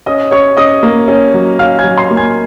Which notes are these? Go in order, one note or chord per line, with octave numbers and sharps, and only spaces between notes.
C#4 D#5 D#6
C#4 C#5 C#6
C#4 D#5 D#6
A#3
C#4
F#3
C#4 F5 F6
G#5 G#6
F#3
C6 C7
A#3
G#5 G#6